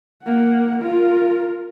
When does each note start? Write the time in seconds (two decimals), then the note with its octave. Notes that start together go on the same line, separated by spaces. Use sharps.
0.23 A#3 F#5
0.78 F4 A#4